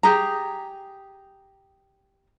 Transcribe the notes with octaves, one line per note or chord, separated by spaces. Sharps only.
G4 G#4 A#5